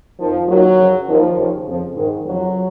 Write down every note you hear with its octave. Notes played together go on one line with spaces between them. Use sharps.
F2 D#3 F3
D#2 D#3 F#3
F#2 C#3 F3
D#2 D#3 F3
D#2 C#3 F3
F2 C#3 F3
G#2 D#3
F2 C#3 F3 F#3